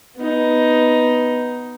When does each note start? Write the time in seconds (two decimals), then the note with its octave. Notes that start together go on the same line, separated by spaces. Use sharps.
0.17 B3 D#4